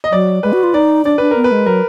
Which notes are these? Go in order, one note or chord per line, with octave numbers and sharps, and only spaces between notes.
D#5
F#3 D5
G#3 B4
F#4
F4
D#4 D5
D4 D5
D4 B4
B3 A#4
B4
G#3
F#3 A#4